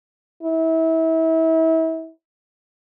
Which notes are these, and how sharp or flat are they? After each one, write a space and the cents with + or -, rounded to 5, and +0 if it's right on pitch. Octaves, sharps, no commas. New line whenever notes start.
E4 -30